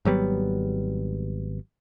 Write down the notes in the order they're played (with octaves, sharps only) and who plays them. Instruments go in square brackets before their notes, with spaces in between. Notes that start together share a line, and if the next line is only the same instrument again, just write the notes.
[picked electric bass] G#1 F#3 G3 B3